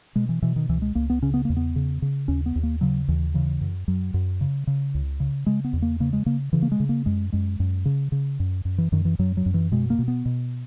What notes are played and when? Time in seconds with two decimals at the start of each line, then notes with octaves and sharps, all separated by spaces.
0.16 B2 G#3
0.29 E3
0.42 B2 E3
0.56 D#3
0.69 C#2 E3
0.82 G#3
0.95 C#2 A#3
1.10 B3
1.22 C#3 C#4
1.34 B3
1.45 E2 A#3
1.57 B3
1.76 C#3
2.02 C#3
2.28 D#2 C#4
2.46 B3
2.56 D#2
2.63 A#3
2.81 C#3 F#3
3.08 D#2 E3
3.34 C#3 E3
3.61 F#2
3.88 F#2 F#3
4.14 F#2
4.41 C#3
4.67 C#3
4.94 C#2
5.20 C#3
5.46 C#3 G#3
5.64 B3
5.73 E2
5.82 A#3
6.00 C#3 A#3
6.13 G#3
6.26 C#3 A#3
6.53 C#3 E3
6.62 A#3
6.72 G#3
6.80 C#3
6.89 A#3
7.06 F#2 G#3
7.32 F#2 G#3
7.60 F#2
7.85 C#3
8.12 C#3
8.40 F#2
8.65 F#2
8.78 E3
8.92 F#2 D#3
9.05 E3
9.19 F#2 F#3
9.37 F#3
9.46 F#2
9.54 E3
9.72 B2 G#3
9.90 A#3
9.99 B2
10.08 B3
10.26 B2